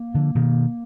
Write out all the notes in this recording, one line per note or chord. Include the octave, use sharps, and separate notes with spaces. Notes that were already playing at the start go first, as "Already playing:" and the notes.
Already playing: A#3
D3 F3
B2 D#3